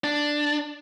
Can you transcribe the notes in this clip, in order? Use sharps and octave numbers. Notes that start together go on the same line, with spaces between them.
D4